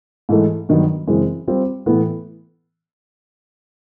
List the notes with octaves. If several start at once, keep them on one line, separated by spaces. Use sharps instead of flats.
G#2 E3 A3
G2 D#3 F#3 B3
F#2 C#3 E3 G#3 C4
G3 C4 F4
A2 E3 B3